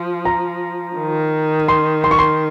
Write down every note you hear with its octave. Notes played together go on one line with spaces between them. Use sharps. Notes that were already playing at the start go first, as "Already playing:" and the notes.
Already playing: F3
A#5
D#3
C6
C6
C#6
C6